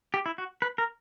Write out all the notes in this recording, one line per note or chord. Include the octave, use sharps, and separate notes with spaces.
G4
E4
F#4
B4
A#4